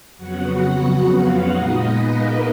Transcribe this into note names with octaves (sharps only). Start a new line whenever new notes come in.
F2 C#3 F#3 B3 F#4 F#5
F4 F5
A#2 G#3 B3 D#4 D#5
B3 B4
A#3 A#4